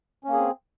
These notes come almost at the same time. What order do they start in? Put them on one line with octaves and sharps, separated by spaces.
C#4 A#3 G#4 C4